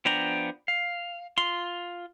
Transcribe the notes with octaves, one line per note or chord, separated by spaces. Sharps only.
F3 B3 D4 G5 A#5
F5
F4 C6